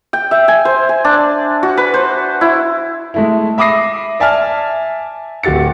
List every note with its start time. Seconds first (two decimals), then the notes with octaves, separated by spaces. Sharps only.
0.13 G5
0.31 E5
0.48 G#5
0.65 C5
0.89 G#5
1.05 D4
1.63 F#4
1.77 B4
1.94 C5
2.41 E4
3.14 G#3 A3 E4
3.58 E5 B5 D6 D#6 A#6 C7
4.20 D5 E5 G#5 A5 F6
5.43 D1 F#4 G4 A6 C#7